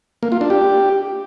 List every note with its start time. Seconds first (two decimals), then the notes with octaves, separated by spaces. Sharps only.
0.23 A#3
0.32 F4
0.41 D4
0.50 G4